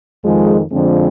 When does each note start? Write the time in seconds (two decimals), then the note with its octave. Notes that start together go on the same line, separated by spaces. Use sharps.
0.25 F2 D#3 F3 G#3
0.72 F2 D3 F3 G#3 C4